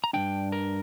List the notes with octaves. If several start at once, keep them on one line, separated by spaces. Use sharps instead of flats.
A#5
G2 F3 D4 G5
A#4